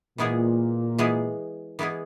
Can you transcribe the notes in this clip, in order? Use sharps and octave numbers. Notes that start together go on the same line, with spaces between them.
A#2 E3 G#3 B3 E4 G#4
E3 G#3 B3 E4 G#4
E3 G#3 B3 E4 G#4